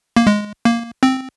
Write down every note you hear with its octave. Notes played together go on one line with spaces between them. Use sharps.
A#3
G#3
A#3
C4